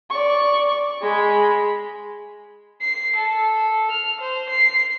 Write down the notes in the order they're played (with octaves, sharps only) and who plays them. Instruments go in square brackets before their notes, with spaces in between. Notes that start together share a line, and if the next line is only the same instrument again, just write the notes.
[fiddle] D5 C#6
G#3 B5
[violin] C7
A4
F6
C5
C7